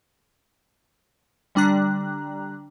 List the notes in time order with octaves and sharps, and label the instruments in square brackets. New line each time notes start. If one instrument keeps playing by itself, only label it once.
[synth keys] D3 G3 D4 A#5 F#6